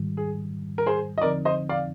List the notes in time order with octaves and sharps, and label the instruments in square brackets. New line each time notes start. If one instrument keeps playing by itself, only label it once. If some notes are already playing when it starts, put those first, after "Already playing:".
Already playing: [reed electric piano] G#2 D#3 G3
[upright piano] G#4
A#4
G#4 C5
D#5
[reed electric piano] D3 F3 C4 D#4 [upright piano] A#4 D5
[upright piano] C5 D#5
D5 F5